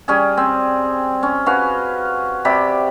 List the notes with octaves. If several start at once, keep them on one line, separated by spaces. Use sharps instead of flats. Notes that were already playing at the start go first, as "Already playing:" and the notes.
G3 C#4 G#4
C4
C#4
C#4 F#4 B4 F5
C3 G4 D5 B5